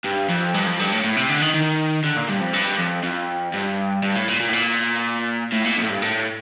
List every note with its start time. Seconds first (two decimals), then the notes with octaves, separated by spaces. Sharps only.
0.05 G2
0.30 F2
0.54 G2
0.66 F2
0.79 G2
0.92 A2
1.04 A2
1.17 C3
1.29 D3
1.42 D#3
1.54 D#3
2.04 D3
2.16 A#2
2.29 G2
2.41 F2
2.54 G2
2.79 F2
3.03 F2
3.53 G2
4.03 G2
4.15 A2
4.28 A#2
4.40 A#2
4.48 A2
4.53 A#2
5.52 A2
5.65 A#2
5.77 F2
5.83 A2
5.89 G2
6.02 A2